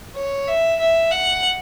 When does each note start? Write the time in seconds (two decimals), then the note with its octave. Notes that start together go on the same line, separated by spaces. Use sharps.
0.15 C#5
0.48 E5
0.80 E5
1.12 F#5